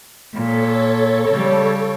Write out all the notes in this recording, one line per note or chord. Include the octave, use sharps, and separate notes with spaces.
A#2 A4 C#5
C#3 G3